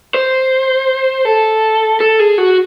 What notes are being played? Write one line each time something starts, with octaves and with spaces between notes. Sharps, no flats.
C5
A4
A4
G#4
F#4